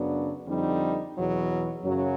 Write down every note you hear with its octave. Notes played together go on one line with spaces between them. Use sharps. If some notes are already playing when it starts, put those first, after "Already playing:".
Already playing: F#2 C#3 F#3 B3 D4
F2 D3 G3 C4 D#4
E2 B2 F#3
F#2 C#3 F#3